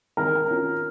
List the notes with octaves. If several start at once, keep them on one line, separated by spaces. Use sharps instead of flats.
D#3 A#4
C#4 F4